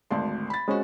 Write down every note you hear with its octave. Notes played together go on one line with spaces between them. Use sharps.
G#1 D2 D5 A5 C6
B5 A6
G#3 C4 C#4 F#4